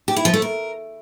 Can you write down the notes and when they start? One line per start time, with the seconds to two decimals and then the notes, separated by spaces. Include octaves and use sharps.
0.08 G4
0.16 E4
0.25 F3
0.34 A3
0.42 A#4